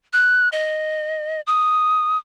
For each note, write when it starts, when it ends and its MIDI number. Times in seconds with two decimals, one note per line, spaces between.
0.13 0.49 90
0.52 1.41 75
1.47 2.18 87